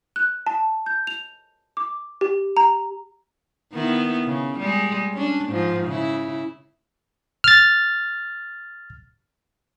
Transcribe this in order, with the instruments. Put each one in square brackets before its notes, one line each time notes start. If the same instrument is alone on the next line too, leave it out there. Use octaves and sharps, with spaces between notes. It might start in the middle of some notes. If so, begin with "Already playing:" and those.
[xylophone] F#6
A5
G6
F7
D6
G4
A#5
[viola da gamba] D#3 B3 E4
C#3
G3 G#3
C#4 D4
G#2 F3
C#3 E4
[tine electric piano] F6 A6